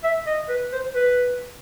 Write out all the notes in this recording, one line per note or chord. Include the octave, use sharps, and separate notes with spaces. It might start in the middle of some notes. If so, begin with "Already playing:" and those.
E5
D#5
B4
C5
B4